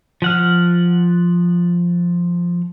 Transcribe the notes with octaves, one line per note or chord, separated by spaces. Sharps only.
F3 F#5 F6